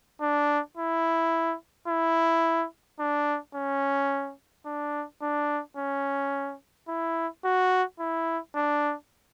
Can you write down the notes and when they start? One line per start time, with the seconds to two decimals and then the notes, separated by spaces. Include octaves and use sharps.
0.21 D4
0.77 E4
1.88 E4
2.99 D4
3.55 C#4
4.66 D4
5.22 D4
5.77 C#4
6.88 E4
7.44 F#4
7.99 E4
8.55 D4